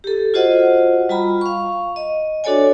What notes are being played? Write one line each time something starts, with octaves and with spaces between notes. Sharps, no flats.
G4 A4
F4 F#4 C5 D#5 F#5
G3 F4 A#5 B5
F5 C#6
D#5
D4 F#4 A4 C#5 D5 G#5